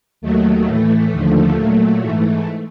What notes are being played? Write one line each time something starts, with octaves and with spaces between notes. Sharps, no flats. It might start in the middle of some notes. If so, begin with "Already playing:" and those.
D#2 D#3 F#3 A3
A2 E3 A3
D#2 D3 F3
A#2 F#3
G#2 E3 A3